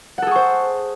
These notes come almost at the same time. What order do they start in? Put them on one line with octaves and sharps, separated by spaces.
F#5 A4 G#4 C#6 C5